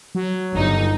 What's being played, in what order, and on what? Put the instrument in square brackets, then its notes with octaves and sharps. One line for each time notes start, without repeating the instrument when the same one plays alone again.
[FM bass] F#3
[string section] G1 D#4